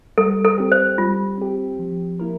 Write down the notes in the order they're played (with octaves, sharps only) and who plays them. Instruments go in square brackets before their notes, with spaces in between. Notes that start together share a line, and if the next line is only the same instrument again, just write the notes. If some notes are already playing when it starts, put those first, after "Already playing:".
[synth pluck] G3 [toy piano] A4
[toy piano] A4
[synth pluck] C4 G4
[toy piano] C5
[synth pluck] G3 [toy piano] F4
[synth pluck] C4 G4
F3
A#3 E4 A#4